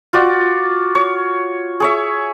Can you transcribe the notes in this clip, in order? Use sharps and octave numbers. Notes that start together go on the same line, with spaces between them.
F4 F#4 D5
C#5
G#4 C#5 E5